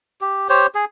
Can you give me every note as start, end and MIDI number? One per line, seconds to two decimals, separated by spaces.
0.21 0.48 67
0.49 0.67 67
0.49 0.67 72
0.49 0.67 73
0.75 0.85 68